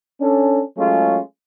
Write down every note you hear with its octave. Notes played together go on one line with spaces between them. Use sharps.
C#4 D4 A4
F#3 G#3 A3 C#4 F4 G#4